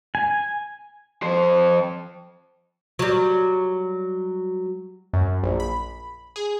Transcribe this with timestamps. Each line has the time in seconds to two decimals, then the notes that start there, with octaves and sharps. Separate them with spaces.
0.15 G#5
1.23 F2 C5
2.99 F#3 G3
5.13 F#2
5.43 A#1
5.60 B5
6.36 G#4